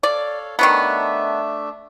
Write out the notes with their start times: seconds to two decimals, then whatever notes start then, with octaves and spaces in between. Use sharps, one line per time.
0.03 A4 C#5 D5 F5
0.59 D#3 F#3 A3 B3 D4 E5